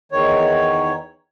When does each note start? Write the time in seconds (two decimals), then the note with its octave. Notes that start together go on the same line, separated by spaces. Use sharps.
0.12 E2 D#3 C#5